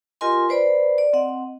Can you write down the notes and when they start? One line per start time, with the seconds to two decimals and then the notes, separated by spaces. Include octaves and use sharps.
0.21 F4 G4 A#4 D#5 G#5 C6
0.49 B4 C5 D5 B5
0.98 D5
1.13 C4 D#5 F#5